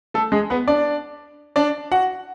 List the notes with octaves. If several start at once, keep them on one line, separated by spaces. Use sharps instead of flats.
A3 A4
G#3 G#4
B3 B4
D4 D5
D4 D5
F#4 F#5